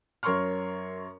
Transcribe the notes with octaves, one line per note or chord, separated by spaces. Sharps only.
F#2 A#4 C#5 C6 C#6 F6